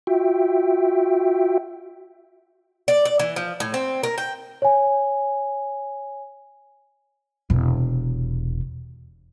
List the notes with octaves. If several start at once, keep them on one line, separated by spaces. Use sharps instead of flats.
F4 F#4 E5 G5
D5
D5
E3
F3
A2
C4
A#4
G5
C#5 G#5
E1 C3